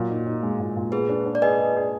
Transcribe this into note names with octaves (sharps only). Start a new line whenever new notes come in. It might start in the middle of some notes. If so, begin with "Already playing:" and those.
Already playing: A#2 F#3
D#4
D#4
G#3
A#2
A#2
B3 G#4 B4
D4
D4
D5
G#4 B4 D#5
G#4
G#4